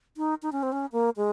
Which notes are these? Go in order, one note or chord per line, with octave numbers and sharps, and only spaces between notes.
D#4
D#4
C#4
C4
C#4
A#3
G#3